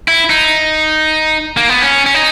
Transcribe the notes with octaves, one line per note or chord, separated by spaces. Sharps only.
E4
D#4
A#3
B3
C#4
C#4
D#4